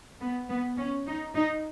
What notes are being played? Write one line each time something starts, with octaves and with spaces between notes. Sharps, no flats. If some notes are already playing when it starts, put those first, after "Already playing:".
B3
B3
C#4
D#4
D#4